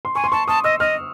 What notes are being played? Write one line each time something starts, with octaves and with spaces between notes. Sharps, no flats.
C6
G#5 C#6
C6
A5 C#6
A5 D#6
D#5 E6
D#5 F6